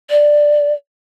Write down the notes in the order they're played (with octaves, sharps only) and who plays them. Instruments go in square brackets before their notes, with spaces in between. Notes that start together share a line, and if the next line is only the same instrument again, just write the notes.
[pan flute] D5